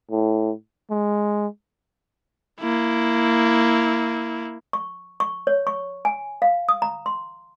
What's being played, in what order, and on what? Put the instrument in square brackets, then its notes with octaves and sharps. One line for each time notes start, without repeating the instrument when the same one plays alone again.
[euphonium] A2
[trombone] G#3
[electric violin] A#3 E4
[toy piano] C#6
C#6
C#5
C#6
G#5
F5
D#6
A#5
C6